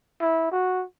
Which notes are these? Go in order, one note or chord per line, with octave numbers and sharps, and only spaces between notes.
E4
F#4